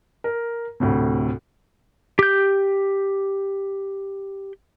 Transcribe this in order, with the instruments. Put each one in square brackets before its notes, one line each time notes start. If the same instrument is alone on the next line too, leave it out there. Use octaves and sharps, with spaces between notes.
[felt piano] A#4
D2 A2 C3
[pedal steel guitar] G4 G6